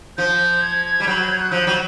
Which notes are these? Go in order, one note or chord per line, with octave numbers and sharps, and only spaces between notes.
F3 G6
G#6
G3
F#3 G6
G#6
G6
F#6
F3 G6
F#3